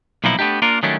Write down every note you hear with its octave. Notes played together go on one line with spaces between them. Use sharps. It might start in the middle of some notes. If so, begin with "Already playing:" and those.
B1 A#2 D3 F3 D#4 E4
A3 B3 D4 D#4 G4
A#3 D4 F4 A#4
D#3 F#3 G3 A3 C#4 D4